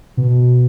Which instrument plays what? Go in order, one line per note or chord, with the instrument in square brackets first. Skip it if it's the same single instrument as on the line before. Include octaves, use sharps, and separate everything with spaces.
[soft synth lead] B2